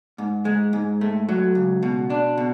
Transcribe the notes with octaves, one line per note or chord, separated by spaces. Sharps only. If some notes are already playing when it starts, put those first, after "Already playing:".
G#2
G#3
G#2
A3
F#3
C#2
B2
D4
B2